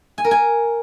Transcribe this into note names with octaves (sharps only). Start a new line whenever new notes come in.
G#5
A#4
G#5